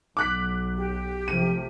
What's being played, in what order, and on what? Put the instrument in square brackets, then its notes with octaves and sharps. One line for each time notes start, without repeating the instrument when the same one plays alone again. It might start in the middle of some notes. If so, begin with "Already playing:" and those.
[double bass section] B1 [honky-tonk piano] D6 F#6 B6
[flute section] G4
[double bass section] C3 F3 A3 [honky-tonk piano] D#7